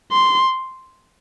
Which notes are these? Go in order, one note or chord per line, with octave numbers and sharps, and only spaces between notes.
C6